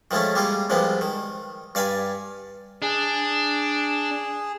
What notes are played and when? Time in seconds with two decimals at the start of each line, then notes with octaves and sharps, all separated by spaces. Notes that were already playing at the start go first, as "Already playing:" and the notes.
0.11 D#3 F3 G#3 A3 C#4
0.35 G3 G#3 A#3 F4
0.70 C2 C3 F3 G#3 B3
1.01 D#3
1.75 G2 D5 F5 G#5 B5
2.82 D4 G#4